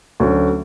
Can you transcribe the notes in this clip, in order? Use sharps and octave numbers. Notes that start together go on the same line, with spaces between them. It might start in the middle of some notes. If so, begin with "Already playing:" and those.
D2 D3 F#3 A3 C#4